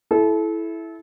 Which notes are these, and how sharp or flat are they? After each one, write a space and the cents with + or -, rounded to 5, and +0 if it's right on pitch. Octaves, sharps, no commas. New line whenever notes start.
E4 +0 A4 -30